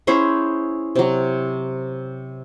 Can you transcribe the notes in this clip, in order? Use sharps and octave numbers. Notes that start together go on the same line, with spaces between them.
C#4 E4 G#4 C5
C3 F#3